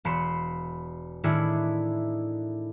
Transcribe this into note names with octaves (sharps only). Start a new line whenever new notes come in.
E1 B5 C6 C#7 E7
A2 D#3 D4 E4 G#4 C#7